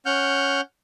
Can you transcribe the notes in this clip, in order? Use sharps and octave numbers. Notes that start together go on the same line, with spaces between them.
C#4 F#5 F6 G6